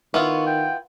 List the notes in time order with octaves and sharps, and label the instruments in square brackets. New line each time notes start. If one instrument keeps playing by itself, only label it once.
[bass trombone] D#3 [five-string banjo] B3 E4 F4 [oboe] C#6
[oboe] G5